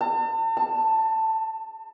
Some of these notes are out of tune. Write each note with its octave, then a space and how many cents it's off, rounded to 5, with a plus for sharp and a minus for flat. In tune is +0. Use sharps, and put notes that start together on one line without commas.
A5 +40
A5 +10